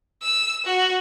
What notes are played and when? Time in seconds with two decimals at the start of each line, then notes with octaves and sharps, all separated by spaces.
0.22 E6
0.65 F#4